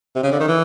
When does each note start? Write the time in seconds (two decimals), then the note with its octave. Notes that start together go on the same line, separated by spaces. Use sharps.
0.15 C3
0.23 C#3
0.31 D3
0.40 D#3
0.48 E3